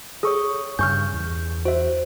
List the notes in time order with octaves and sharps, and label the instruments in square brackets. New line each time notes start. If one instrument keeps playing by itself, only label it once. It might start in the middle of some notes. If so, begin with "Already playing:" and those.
[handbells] G#4 A4 [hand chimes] C#5 C#6 D#6
[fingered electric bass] G2 C#3 [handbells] G#5 C#6 F6 [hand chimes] G6
[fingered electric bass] E2
[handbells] F#4 E5 [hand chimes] C5